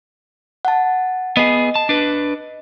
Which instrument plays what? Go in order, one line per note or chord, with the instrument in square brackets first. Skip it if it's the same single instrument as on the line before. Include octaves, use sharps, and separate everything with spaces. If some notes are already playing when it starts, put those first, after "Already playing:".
[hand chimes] F#5 A5
[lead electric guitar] B3 G#4 [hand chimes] D#5
[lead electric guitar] A5
D4 B4